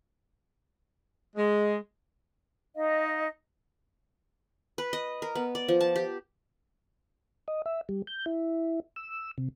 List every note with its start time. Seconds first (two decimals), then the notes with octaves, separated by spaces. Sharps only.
1.36 G#3
2.76 D#4 D#5 F5
4.78 B4
4.93 D#5
5.22 A#4
5.35 B3
5.55 D5
5.68 F3
5.81 A5
5.96 G4
7.48 D#5
7.66 E5
7.89 G3
8.07 G6
8.26 E4
8.96 E6
9.38 C3